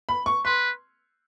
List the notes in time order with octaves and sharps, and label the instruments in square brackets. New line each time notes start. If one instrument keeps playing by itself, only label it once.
[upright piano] B5
C#6
[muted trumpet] B4 [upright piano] C6